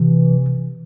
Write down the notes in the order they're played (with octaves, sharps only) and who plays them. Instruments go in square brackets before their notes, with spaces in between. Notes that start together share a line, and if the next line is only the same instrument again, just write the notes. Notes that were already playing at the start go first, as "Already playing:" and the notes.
Already playing: [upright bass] C3 [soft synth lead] E3